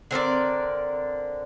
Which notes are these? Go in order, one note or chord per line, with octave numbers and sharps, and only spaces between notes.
D3 C4 A#4 D5